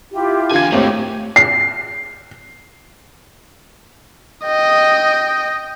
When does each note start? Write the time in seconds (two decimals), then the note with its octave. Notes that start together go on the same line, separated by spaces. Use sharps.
0.11 E4 F4 G4
0.51 E2 D3 F4 G#5 G#6
0.72 G#1 D#2 A2 A3 G4 C5 C#5
1.36 C7
4.45 D#5 G5